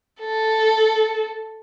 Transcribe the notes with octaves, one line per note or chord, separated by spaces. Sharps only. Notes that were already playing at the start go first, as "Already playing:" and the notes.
A4